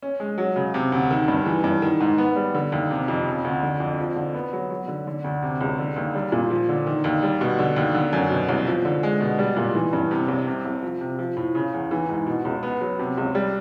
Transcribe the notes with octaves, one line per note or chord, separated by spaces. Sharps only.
C#4
G#3
F#3
C#3
C3
D2
D#3
G2
E3
G2
D#3
G#2
B3
G3
D3
D#2
C3
F2
C#3
D2
D3
F2
F3
D3
B3
F#3
F#3
D3
D3
D2
C3
C#2
D3
D#2
G3
A#2
F3
D3
D#3
D#2
G3
B2
D3
D#2
D3
F#2
B2
C2
F3
D3
G#3
B2
G3
A#2
E3
G2
C3
C2
C3
C2
F3
C3
F3
A2
C#3
E2
E3
G#2
B2
C#2
B3
F#3
C3
C#2
G3